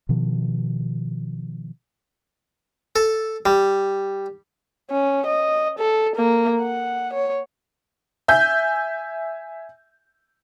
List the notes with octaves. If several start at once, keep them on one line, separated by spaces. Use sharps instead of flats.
B2 D#3 F3
A4
G3
C#4
D#5
A4
A#3
F#5
C#5
E5 G#5 G6